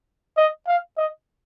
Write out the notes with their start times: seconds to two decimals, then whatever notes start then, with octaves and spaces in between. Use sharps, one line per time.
0.37 D#5
0.67 F5
0.98 D#5